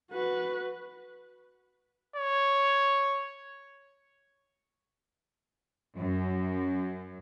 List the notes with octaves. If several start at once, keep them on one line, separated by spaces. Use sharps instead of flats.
F#4 B4
C#5
F#2